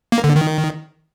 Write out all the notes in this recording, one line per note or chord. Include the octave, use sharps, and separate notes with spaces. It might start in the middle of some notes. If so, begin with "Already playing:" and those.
A#3
D3
D#3